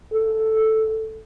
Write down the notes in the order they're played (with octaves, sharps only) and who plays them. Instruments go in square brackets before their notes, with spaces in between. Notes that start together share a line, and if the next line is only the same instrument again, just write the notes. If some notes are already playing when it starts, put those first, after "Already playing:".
[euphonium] A4